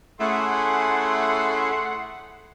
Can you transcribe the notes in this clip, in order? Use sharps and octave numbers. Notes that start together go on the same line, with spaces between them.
A3 C#4 E4 G#4 F#5 C6